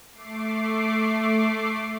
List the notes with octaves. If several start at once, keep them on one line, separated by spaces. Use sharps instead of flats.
A3 D6 C7